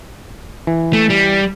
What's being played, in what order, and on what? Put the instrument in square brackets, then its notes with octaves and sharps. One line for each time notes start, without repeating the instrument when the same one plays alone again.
[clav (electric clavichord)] E3
[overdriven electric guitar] A3
G3